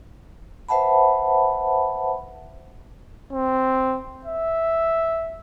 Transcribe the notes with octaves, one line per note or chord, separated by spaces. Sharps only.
B4 C5 E5 F#5 A5 B5
C4
E5